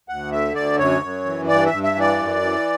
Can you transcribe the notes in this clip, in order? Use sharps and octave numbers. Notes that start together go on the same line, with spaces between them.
D2 F#5
D3 E5
D2 D5
F#2 C#5
F#2
E3
G2 D5
E5
G2
E5
E3
D5
F#2
E3